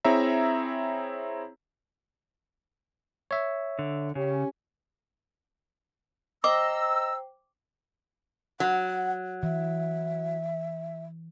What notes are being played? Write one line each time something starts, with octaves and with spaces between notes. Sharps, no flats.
C4 E4 G#4 C#5 E5 A#5
C#5 E5
D3
C#3 C#4 G4
C5 D#5 G5 A#5 D6 E6
F#3 F#5
E3 E5